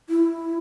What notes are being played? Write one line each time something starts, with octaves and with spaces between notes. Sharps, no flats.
E4